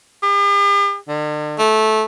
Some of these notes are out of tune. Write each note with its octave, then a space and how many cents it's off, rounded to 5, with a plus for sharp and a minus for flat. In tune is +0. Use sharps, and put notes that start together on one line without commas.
G4 +45
D3 +45
A3 -15